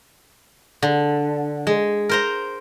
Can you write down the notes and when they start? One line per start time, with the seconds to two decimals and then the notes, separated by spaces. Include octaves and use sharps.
0.82 D3
1.67 G#3
2.09 A#4 C5 A#5